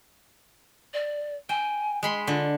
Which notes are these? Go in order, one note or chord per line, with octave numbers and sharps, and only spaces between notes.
D5
G5 G#5
G#3 B5 C6
D3 F4